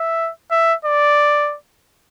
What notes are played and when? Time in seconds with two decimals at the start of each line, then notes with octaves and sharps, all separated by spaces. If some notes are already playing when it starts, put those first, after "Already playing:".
Already playing: E5
0.51 E5
0.85 D5